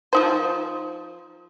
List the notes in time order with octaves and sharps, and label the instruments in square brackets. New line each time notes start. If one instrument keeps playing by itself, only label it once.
[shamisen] F3 D#4 C5